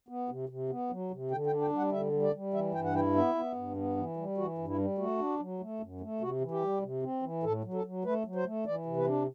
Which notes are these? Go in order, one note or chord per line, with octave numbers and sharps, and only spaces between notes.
B3
C3
C3
B3
F#3
C3
D3 G5
G5
D4
G5
G3 F#5
D3 E5
G3
D5
G3
E3 E5
G2 G5
F#5
E4 G5
B3 E5
B3
G2
B3
E3
G3
E3 F#4
G2
E4
G3
A3 F#4
D4
F#3
A3
F#2
A3
C3 F#4
E3
G4
G3
C3
C4
E3
A2 A4
F#3
A4
F#3
A3 B4
F#3
C5
A3
E3 D5
C3
B4
D4